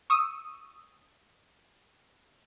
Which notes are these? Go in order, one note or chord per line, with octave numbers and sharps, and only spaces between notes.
C#6 D#6 E6